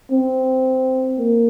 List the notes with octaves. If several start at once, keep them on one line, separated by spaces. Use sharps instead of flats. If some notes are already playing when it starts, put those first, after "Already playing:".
C4
A#3